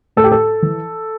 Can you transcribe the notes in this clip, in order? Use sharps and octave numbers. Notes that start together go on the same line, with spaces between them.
A2 A4
G4
A4
E3